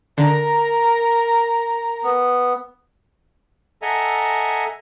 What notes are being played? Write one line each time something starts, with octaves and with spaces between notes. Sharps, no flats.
D3 A#4 A#5
B3
A4 D#5 E5 F#5 G#5 A#5